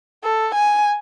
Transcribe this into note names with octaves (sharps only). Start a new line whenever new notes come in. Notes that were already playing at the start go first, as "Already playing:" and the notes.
A4
G#5